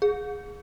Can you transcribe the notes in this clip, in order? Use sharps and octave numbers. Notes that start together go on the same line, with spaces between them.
G#4